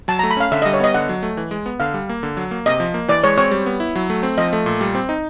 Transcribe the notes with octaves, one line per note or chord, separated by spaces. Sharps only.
F#3 A5
A3 A#5
B5
C#4 F5
D3 E5
G3 D#5
C#5
B3 D#5
D3 F#5
F#3
A3
E3
G#3
B3
D3 F5
G3
A#3
D3
F#3
A#3
C3 D#5
F3
A#3
E3 D5
G#3 C#5
C4 C#5
G3
B3
E4
F#3
A3
C4
F3 D#5
A3
A#2
G3
C4
D#4